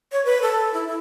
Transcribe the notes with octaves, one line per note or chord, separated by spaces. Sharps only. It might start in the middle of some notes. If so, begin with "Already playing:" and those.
C#5
B4
A4
E4
E4